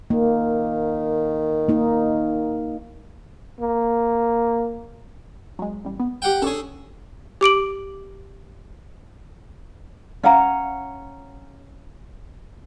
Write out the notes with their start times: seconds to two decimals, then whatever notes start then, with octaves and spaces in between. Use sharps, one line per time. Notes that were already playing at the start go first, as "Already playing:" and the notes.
0.10 D#3 A#3
1.69 A#3 D#4
3.61 A#3
5.59 F#3 G#3
5.85 A1 G3
6.00 B3
6.22 G4 F#5 G5
6.42 C#4 D4 G#4 A4 C#5
7.41 G4 D6 D7 F#7
10.23 C#4 F5 F#5 A#5